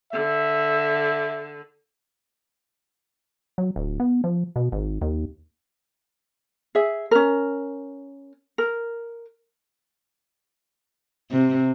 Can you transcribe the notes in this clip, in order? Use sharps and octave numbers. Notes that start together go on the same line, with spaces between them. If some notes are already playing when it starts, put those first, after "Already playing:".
D3 E5
F#3
D1
B3
F3
B2
G#1
D#2
G#4 E5
C#4 A#4
A#4
C3